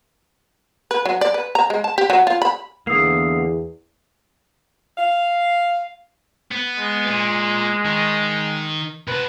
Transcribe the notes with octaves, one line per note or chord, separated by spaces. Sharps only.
B4
F#3
D5
B4
A#5
G#3
A5
G4
F#3
F4
B5
E2 D3 A#3 D#6 E6 C7
F5
B3
G#3
A#2
D#3
C3 B4 A5